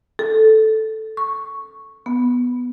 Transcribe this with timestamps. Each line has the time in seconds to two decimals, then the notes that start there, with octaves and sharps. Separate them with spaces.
0.19 A4
1.17 C#6
2.06 B3